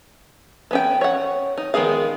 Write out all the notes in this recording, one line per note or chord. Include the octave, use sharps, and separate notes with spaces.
B3 C#4 G5
C#5 F#5
D#4
D#3 G#3 B3 G#4 F5